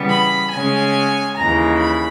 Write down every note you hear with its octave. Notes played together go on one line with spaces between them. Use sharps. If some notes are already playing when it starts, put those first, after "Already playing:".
Already playing: C#3 E3 G3 B3
B5
C#3 G#3 C#4 G#5
D#2 C#3 E3 A#5
B5